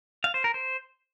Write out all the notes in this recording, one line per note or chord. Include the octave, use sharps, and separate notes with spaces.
F5
C5
A#4
C5